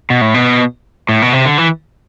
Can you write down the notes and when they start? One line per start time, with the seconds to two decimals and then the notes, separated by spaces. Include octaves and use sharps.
0.10 B2
0.21 A2
0.34 B2
1.09 A2
1.22 B2
1.33 C3
1.45 D3
1.58 E3